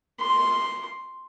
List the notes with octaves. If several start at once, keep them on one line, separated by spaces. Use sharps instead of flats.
C6